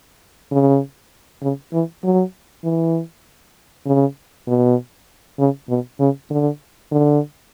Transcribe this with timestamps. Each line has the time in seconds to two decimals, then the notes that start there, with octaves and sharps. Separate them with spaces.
0.51 C#3
1.42 C#3
1.73 E3
2.04 F#3
2.64 E3
3.86 C#3
4.47 B2
5.39 C#3
5.69 B2
5.99 C#3
6.30 D3
6.92 D3